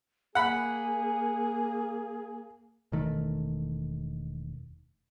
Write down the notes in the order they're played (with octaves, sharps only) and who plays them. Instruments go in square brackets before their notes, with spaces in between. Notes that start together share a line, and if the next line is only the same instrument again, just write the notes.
[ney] A#3 [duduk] G#4 [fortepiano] F#5 B5
[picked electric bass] E1 D#3 A3